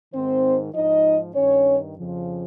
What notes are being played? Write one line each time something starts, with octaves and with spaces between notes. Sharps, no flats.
G#2 D#3 C4 C5
G#2 F3 D#4 D#5
G2 D#3 C#4 C#5
F2 C#3 F3